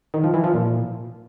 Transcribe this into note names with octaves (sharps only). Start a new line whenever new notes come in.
D#3
F3
E3
F3
A#2